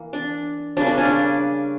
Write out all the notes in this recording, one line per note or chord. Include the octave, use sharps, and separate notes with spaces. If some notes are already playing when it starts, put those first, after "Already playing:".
Already playing: E3 A#3
D4
C#3 G3 A#3 D4
D4
C#4
D4